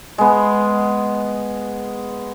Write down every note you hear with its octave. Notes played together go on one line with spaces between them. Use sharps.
G#3 B3